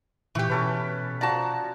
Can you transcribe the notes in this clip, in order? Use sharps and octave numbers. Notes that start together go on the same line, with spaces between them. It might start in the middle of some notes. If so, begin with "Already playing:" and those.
A#2 E3 G4 G5 C#6
B2 C#4 A4 B4
F3 F#4 D5 A5 A#5